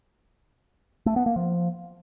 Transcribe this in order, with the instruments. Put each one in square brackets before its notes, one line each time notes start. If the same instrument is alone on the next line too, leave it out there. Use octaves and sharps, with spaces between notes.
[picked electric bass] A3
B3
A#3
F3